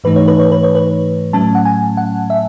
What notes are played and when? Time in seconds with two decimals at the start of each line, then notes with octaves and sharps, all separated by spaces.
0.04 G#2 E3 A3 D#4 B4
0.16 C#5
0.28 B4
0.39 C#5
0.52 B4
0.63 C#5
0.75 B4
1.33 A2 F#3 A3 C#4 A5
1.55 F#5
1.65 G#5
1.97 F#5
2.30 E5